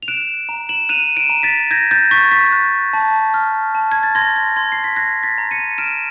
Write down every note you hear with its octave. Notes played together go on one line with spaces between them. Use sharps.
F7
F#6 D7 E7
A#5
E7 F#7
F#6 D#7 F7
D7 E7
A#5
A6 B6
G6 G#6 A#6
G6 A6
C#6 A6 B6
A6 B6
F#6
A5
F6
A5
G#6
A6
C6 G#6 A#6
G#6
C6 G#6
C7
B6
F#6 G#6 A#6
A6 B6
A#5
C#7 D#7
F6 D7 E7